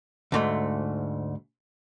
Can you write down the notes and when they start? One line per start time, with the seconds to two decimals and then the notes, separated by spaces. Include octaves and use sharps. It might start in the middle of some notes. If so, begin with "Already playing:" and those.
0.32 D2 G#2 A3